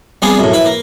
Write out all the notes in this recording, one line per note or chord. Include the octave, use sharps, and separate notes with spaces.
G3 B3 C4 D4 F4 G#4
F#2 A2
E4 B4
A#3